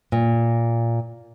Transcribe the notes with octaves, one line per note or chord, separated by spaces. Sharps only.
A#2